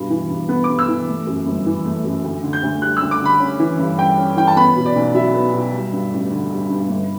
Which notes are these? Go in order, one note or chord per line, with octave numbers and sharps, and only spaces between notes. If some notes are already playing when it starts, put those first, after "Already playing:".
Already playing: G2 B2
E3
G2
B3
D6
G2
E6
E3
A3
F#2
G1
E3
A3
F#2
D2
D3
G6
D2
G3 F#6
E6
D2
D6
D3 B5
C#4
E3
G2
G3 G5
C#4
E3 G5
A5
B3 B5
B2
D5
B1
F#3 E5
B3
B2
G3
G2
A1
D3
G3
G2
G1